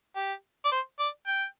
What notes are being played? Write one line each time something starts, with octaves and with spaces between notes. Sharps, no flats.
G4
D5
C5
D5
G5